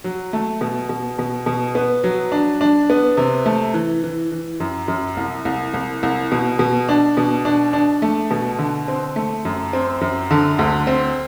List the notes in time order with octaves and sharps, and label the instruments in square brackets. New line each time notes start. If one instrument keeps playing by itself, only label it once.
[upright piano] F#3
A3
B2
B2
B2
B2
B3
F#3
D4
D4
B3
C3
A3
E3
E3
E3
F#2
F#2
C2
C2
C2
C2
B2
B2
D4
B2
D4
D4
A3
B2
D3
C4
A3
F#2
C4
F#2
D3
D2
C4